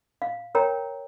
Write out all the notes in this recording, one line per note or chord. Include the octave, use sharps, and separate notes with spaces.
F5
A#4 C#5 G5 A#5